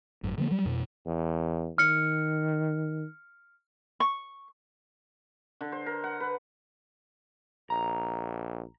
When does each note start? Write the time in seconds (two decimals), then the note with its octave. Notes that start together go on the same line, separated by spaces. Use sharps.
0.23 G#1 F#2
0.38 D3 F3 G#3 A#3
0.51 F#3 G3
0.65 F2 B2
1.06 E2
1.78 D#3 F6 C#7
4.00 C#6
5.61 D3
5.72 C5
5.86 A#4
6.04 F#5
6.20 B4
7.70 A#1 A#5